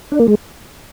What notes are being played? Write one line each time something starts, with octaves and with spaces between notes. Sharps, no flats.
D4
A#3
G#3